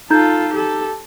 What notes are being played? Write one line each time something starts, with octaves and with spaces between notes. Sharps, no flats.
D#4 F4 A4 A#5 G6
G4 A4